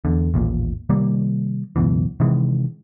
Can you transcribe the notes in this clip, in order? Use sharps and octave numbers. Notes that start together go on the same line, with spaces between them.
E2 D3
A1 D#2 A#2
C3 D#3 G3 A#3
C#2 F#2 B2 E3
C3 D#3 E3 G#3